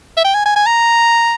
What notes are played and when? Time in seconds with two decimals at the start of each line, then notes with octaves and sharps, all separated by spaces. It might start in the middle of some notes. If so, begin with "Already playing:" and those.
0.17 E5
0.25 G5
0.35 G#5
0.46 G#5
0.56 G#5
0.66 A#5